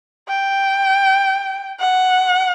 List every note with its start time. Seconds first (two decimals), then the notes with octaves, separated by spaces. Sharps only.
0.29 G5
1.81 F#5